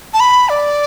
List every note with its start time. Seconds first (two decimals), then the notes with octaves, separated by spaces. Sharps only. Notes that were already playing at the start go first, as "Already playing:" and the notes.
0.14 A5
0.20 B5
0.49 D5